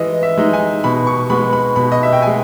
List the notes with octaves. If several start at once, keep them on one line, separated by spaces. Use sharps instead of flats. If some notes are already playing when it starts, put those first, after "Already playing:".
Already playing: E3 G#3 D#5
E5
G#3 D#4
G#5
B2 B5
C#6
G#3 B3 B5
B5
B2 B5
D#5
E5
G5
G#3 B3 G#5